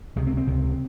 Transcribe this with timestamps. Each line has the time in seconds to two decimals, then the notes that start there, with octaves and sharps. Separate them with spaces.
0.16 C#2 C3 G#3
0.27 C4
0.37 C4
0.47 C#2 C3